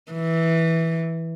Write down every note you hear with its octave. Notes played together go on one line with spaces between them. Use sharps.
E3